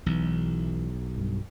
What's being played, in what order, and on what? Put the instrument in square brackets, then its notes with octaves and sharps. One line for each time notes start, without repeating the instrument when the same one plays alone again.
[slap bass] B1 [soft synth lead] E3
[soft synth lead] G2